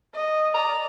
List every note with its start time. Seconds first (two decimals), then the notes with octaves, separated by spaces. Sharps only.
0.15 D#5
0.54 D5 A#5